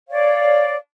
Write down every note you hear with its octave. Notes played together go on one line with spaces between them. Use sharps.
C#5 D5 F5